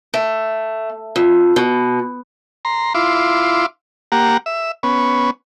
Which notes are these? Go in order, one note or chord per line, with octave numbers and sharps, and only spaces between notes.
A3
F2
B2
A#5 C6
E4 F4 C6 D6
A#3 G4 F#5 A#5
E5
B3 C#4